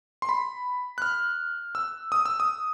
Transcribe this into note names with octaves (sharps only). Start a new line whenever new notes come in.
C6
B5
F#6
F6
E6
D#6
E6
D#6